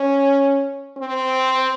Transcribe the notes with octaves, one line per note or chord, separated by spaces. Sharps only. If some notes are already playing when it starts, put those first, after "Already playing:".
Already playing: C#4
C4